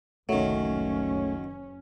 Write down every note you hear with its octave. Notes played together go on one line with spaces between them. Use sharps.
F#1 C2 D#3 F#3 A3 C#4